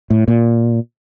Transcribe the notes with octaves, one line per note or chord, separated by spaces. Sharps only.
A2
A#2